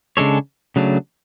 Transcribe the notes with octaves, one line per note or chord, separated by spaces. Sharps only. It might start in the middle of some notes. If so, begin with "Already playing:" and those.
C#3 G#3 D4 A4 C#5
C#3 F#3 A3 D4